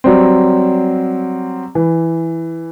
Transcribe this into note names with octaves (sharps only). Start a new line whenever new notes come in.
F#3 G3 C4
E3